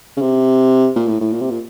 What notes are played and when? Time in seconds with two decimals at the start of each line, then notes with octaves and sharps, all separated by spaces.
0.17 C#3
0.22 C3
0.96 A#2
1.07 A2
1.20 A2
1.32 A#2
1.41 C3
1.51 A#2